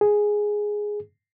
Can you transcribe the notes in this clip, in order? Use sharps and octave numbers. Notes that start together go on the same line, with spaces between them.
G#4